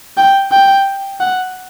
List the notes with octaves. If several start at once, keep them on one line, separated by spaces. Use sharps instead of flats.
G5
G5
F#5